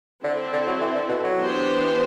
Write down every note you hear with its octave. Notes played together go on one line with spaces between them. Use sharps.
D3 C4 E4 A4
D3
F#3
E3
D3
B2
F#3
E3 B3 D4 G4 C5